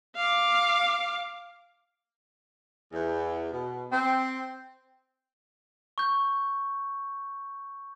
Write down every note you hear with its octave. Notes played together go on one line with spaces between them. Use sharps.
F5 D6
E2
B2
C4
C#6 G6